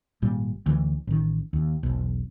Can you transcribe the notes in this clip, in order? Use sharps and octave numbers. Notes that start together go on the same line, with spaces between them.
G#1 A#2 G3
D2 E3
A1 D#3
D#2
E1 B1